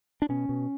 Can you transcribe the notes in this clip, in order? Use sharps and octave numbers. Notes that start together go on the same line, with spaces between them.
D4
B2 C#4
B2